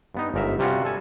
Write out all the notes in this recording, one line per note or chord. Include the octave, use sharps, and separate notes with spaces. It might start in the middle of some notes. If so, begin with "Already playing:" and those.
G2 B3 D#4
G1 G#2 A#4 E5
C3 G3 C#4 F4 F#4
A4 G#5 A5